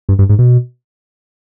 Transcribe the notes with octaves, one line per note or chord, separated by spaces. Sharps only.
G2
G2
G#2
B2